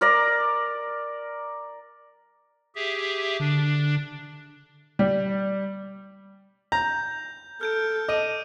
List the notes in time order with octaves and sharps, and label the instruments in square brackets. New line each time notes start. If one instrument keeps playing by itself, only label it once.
[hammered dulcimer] A#4 D5 A#5
[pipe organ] G4 G#4 E5
[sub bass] D3 [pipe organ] D4
[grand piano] G3
[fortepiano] A#5 [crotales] G6
[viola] A4 [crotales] F6 G6 D7
[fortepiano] D#5 [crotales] D6 D#6 D#7